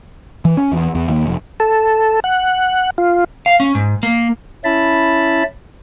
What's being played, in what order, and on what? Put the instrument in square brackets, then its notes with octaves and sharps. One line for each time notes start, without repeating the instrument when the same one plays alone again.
[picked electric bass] E3
C#4
E2
E2
D#2
F1
[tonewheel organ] A4
F#5
F4
[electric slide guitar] F5
C#4
G#2
A#3
[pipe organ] C#4 E4 A5 B5